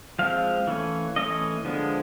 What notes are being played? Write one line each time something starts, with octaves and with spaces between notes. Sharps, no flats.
F3 G#3 C4 F5
E3 A3 C#4
E3 A3 C#4 D#5
D3 F3 G#3 B3